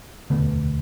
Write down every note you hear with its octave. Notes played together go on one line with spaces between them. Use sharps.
E1 D2 D3 A3 B3